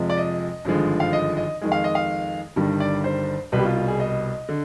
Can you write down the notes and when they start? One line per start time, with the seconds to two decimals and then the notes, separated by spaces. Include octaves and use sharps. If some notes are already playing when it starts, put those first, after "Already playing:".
Already playing: F2 C3 F3 G#3
0.10 D5
0.18 D#5
0.65 G#1 G2 D3 F3 G#3
1.00 F5
1.13 D#5
1.37 D#5
1.61 F2 D#3 G#3
1.72 F5
1.84 D#5
1.95 F5
2.56 G1 G2 D#3 G3
2.80 D5
3.04 C5
3.52 C2 B2 G3 B4
3.59 G4
3.65 F4
3.76 F4
3.88 G#4
4.00 D#5
4.49 D3